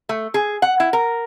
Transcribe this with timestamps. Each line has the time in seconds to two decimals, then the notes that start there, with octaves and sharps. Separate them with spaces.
0.09 A3
0.34 G#4
0.62 F#5
0.80 E4
0.93 A#4